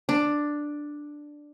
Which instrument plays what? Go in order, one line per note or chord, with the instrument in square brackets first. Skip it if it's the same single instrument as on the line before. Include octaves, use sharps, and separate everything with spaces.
[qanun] D4